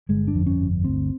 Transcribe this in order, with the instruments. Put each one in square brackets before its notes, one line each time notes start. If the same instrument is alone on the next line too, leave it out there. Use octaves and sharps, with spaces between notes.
[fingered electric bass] G1 G#3
D4
F2
C#4
G1
D2 C4